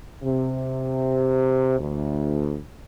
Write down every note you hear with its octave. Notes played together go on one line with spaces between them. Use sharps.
C3
D2